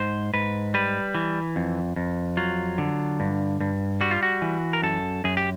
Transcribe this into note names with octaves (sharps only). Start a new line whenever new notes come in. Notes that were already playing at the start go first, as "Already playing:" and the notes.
Already playing: G#2 C5
G#2 B4
G3 B4
E3
F2
F2
F#3 F4
D3
G2
G2
G3 F#4
F4
F#4
E3
A#4
F#2 A4
F#2 G#4
G4